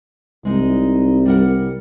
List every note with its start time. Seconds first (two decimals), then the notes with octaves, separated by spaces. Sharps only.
0.45 C2 G#3 D#4
1.26 G3 A#4 F#5